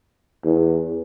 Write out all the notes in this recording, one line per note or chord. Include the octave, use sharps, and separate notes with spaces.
E2